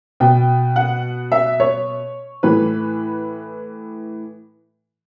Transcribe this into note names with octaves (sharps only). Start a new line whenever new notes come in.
B2 G5
F#5
E5
C#5
A2 E3 B4